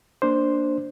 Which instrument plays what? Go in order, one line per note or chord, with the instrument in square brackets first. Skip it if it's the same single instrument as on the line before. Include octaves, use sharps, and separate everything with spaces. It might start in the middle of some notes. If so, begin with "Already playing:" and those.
[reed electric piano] A#3 D4 C5